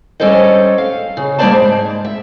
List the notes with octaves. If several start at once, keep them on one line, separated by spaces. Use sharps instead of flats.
G3 C#4 A4 C5 D#5
F5
C#3
G3 A#3 D#4 C5 D5 A5
G#2
E5